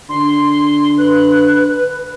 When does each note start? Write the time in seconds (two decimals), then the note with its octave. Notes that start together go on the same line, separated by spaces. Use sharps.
0.09 D3 C6
0.98 B4 F#6